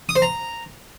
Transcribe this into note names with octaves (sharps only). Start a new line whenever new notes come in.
D#6
C5
A#5